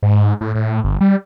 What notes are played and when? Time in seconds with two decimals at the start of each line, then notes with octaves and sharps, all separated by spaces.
0.03 G#2
0.41 A2
0.55 A2
0.84 G1
1.01 G3